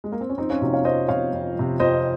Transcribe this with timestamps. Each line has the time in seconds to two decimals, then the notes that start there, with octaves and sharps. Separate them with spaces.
0.04 G#3
0.12 A#3
0.21 C4
0.29 C#4
0.38 F2 C4 D#4
0.50 C#4 F4
0.61 C3 F3 D#4 F#4
0.73 C#5 F5
0.85 F2 C5 D#5
1.08 C3 F3 C#5 F5
1.33 F2
1.56 C3 F3
1.80 F2 C5 D#5